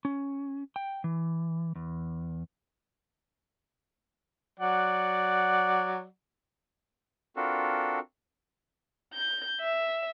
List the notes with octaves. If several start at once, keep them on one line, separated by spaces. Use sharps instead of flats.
C#4
G5
E3
E2
F#3 D5 F#5
C4 D4 F4 F#4 A4 A#4
G6
E5